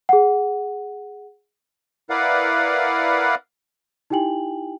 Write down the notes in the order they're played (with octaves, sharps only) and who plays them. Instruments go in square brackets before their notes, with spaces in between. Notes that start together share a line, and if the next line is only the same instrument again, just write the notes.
[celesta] G#4 F#5
[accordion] E4 A#4 B4 D5 F5 F#5
[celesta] D#4 E4 G4 G5 G#5 F#7